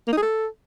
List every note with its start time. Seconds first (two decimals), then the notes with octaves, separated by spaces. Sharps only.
0.07 A#3
0.12 D#4
0.18 G#4
0.23 A4